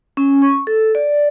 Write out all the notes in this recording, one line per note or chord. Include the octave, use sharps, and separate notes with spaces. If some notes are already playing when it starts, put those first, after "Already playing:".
C#4
C#6
A4
D5